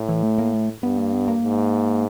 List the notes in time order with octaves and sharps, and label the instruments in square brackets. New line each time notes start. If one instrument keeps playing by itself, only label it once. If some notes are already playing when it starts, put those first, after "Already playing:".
Already playing: [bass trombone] A2
[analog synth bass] E3
A3
A#3
A3
[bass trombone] G2 [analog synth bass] B3
[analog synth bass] A#3
B3
A#3
[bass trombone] G#2